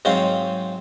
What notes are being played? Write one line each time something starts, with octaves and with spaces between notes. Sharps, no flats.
G#2 F#3 C4 F5